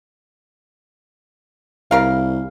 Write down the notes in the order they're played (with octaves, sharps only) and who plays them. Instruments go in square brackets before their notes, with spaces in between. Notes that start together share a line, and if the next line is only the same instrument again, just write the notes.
[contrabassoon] C2 [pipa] C#3 A#4 F5